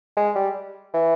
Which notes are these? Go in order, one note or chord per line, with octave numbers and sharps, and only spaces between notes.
G#3
G3
E3